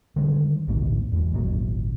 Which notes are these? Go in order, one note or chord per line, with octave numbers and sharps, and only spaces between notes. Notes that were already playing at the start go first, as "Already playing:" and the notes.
D3 D#3 G3 G#3
A1 D2 G#2 B2
E2 G#3
D#1 G#1 A#2 F#3